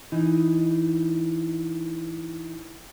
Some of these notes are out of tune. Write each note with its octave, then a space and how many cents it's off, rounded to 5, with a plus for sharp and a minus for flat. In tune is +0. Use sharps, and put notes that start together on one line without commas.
E3 +0 D#4 +0